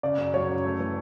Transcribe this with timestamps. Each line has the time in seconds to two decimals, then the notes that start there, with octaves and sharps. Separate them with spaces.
0.03 C#3 D5
0.18 F#2
0.34 F#3 C#5
0.49 F#2
0.64 A3
0.79 E3